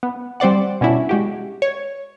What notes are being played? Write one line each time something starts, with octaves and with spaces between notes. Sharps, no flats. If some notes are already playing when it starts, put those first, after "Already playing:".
B3
G3 C4 C5 D5 F#5
B2 C#4 D4 E4 F#4
G#3 F#4 G4
C#5